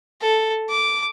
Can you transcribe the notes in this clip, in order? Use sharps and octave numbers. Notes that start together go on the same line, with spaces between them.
A4
D6